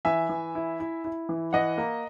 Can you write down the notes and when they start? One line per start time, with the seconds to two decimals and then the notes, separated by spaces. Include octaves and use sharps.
0.05 E3 E5 G#5
0.29 E3
0.55 E4
0.80 E4
1.05 E4
1.29 E3
1.53 E3 D#5 F#5
1.78 A#3